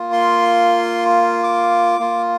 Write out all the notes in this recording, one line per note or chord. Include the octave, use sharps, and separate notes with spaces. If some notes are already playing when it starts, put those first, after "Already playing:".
Already playing: A#3 F4
C6
D6
A#3 F4